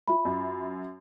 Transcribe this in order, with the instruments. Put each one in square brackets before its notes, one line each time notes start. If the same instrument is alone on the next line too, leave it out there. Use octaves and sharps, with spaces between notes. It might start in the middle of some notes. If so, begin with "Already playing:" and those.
[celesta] F4 E5 B5
[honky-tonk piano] F#2